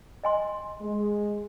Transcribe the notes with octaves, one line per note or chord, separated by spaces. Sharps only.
D#5 G#5 C6
G#3